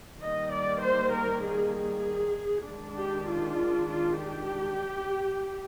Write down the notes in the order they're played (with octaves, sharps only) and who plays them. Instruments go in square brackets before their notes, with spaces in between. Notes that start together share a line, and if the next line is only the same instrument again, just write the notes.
[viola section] D#3 G3 A#3 D#5
D5
C5
A#4
G#4
G#4
D#3 G#3 D4
G4
F4
F4
G4